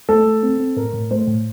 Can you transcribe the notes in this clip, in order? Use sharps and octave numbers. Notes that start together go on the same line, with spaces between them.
A3 A4
A3
C4
C4
A2 A#4
A2
A3 C5
A2